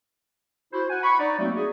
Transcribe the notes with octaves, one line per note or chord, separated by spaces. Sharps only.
E4 F#4 C5
F#5 G#5
B5 C#6
D#4 D5
F#3 A3 A#3 C4 D#4 F#4
F#4 G#4